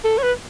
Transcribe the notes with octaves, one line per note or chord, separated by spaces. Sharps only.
A4
C#5
B4